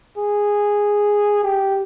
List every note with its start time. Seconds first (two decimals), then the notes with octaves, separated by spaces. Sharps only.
0.17 G#4
1.43 G4